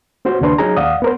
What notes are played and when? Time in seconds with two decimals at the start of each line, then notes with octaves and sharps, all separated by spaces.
0.25 B3 C#4 F#4 C5
0.41 D#2 C#3 D4 B4 C6
0.58 F#3 C#4 D#4 G#4 A#5
0.77 D#2 D5 F5 F#5 D#6
1.02 B3 A#4 C5